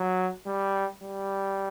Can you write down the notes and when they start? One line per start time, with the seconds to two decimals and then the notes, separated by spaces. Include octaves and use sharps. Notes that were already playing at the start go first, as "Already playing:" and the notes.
Already playing: F#3
0.46 G3
1.03 G3